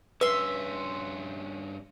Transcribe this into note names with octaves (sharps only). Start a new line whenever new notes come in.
G2 C#4 B4 E5 C6